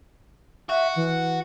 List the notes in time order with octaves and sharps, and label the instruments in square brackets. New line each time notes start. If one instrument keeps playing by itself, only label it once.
[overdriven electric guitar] F#4 [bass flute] E5
[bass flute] E3